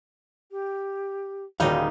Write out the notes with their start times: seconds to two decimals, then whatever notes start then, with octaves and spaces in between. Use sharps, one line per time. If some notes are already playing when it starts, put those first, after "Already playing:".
0.51 G4
1.60 D#1 D#2 G3 D#4 F#4 G#4 C#5 F5